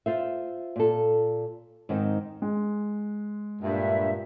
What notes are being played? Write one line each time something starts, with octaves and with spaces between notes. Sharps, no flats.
F4 C5 E5
A#2 A4
G#2 D#3 C4 D#4
G#3
G2 A#2 E5